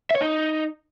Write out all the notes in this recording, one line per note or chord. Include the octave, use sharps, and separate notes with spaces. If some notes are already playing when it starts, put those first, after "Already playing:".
E5
C#5
D#4